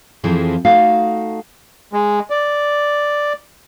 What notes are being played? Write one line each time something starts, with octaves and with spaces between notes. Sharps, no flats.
F2 E3 F3 C4 E4 G#4
A3 D#4 F#4 F5
G#3
D5